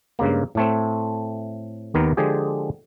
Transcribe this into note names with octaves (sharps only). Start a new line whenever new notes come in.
G2 C#3 G#3 A#3
A2 A3 C4
D#2 D#3 B3 A#4
D3 F3 G#3 G4 G#4